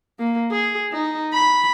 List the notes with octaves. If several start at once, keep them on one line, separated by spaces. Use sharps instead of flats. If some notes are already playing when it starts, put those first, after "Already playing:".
A#3
G#4
D#4
B5